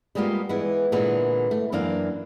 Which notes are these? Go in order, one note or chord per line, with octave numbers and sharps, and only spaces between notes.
G3 G#3 A#3 B3 F4 G4
E3 G#3 B3
A#2 D3 E3 G#3 B3
A3
F#2 E3 A#3 D4 F5